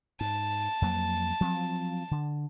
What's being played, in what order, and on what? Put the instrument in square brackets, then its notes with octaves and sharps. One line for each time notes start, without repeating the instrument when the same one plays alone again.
[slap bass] G#2 [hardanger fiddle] A5
[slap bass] F2 F#3 A#3
F3 F#3 C4
D3